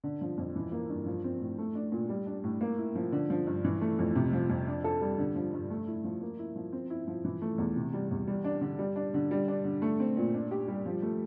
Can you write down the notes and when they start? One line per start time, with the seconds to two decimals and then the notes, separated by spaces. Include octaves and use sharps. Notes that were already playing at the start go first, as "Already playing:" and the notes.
0.04 D3
0.21 F3
0.38 F2
0.56 E3
0.72 A#3
0.89 G2
1.06 F3
1.24 C4
1.41 A2
1.59 A3
1.75 D4
1.92 A#2
2.09 G3
2.26 D4
2.44 A2
2.61 A#3
2.78 E4
2.95 F3
3.12 D3
3.30 F3
3.47 G2
3.64 E3
3.81 A3
3.99 F2
4.16 C3
4.33 F3
4.50 F2
4.67 D4
4.84 A4
5.01 G3
5.18 D3
5.35 F3
5.53 G2
5.70 A3
5.87 E4
6.04 F3
6.21 A#3
6.39 E4
6.56 F3
6.73 C4
6.90 E4
7.07 F3
7.25 E3
7.42 A3
7.58 E2
7.76 C3
7.93 G3
8.11 E2
8.27 G3
8.44 D4
8.61 D3
8.79 G3
8.96 D4
9.14 D3
9.31 G3
9.48 D4
9.64 D3
9.82 A3
10.00 C4
10.17 A#2
10.34 D4
10.51 G4
10.68 G3
10.86 F3
11.02 A3